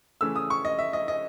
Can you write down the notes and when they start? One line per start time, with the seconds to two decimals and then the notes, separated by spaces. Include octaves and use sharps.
0.21 C#3 E3 A3 E6
0.36 D#6
0.50 C#6
0.65 D#5
0.79 E5
0.93 D#5
1.08 D#5